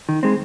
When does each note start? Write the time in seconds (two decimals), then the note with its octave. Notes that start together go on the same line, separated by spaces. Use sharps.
0.09 D#3
0.23 G#3 C4